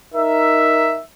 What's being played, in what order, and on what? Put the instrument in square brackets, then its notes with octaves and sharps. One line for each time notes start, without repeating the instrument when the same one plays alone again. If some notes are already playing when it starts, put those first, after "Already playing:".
[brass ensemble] D#4 A#4 E5